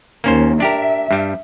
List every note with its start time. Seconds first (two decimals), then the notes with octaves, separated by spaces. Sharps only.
0.24 D#2 A#3 C#4 C5
0.60 D4 G4 A#4 E5
1.11 G2 G3